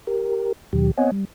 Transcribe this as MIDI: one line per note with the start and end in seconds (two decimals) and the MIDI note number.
0.07 0.53 67
0.07 0.53 70
0.73 0.91 39
0.73 0.91 47
0.73 0.91 51
0.73 0.91 54
0.73 0.91 67
0.98 1.11 59
0.98 1.11 60
0.98 1.11 73
0.98 1.11 75
0.98 1.11 78
0.98 1.11 80
1.12 1.25 55